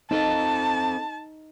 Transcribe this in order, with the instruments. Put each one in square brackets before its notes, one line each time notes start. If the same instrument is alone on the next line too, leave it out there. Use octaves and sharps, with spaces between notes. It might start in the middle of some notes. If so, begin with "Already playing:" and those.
[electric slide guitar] C4 A4 [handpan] D#4 [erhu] A5